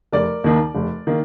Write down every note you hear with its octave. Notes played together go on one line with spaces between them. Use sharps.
F1 A#4 D5
D#2 D#3 A#3
F1
D#3 A#3